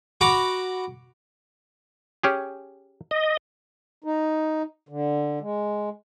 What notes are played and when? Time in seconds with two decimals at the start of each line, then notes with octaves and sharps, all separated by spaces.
0.21 F#4 A#5 B5 D6
2.23 C#4 G4 G#4
3.11 D#5
4.04 D#4
4.89 D3
5.41 G#3